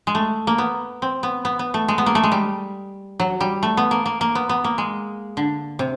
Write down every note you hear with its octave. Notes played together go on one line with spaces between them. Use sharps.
G#3
A3
A#3
B3
C4
B3
B3
B3
A3
G#3
B3
A#3
A3
G#3
G3
F#3
G3
A3
B3
A#3
A#3
A#3
B3
B3
A#3
G#3
D3
C3